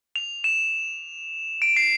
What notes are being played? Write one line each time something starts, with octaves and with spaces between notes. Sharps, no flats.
F7
E7
D7
C7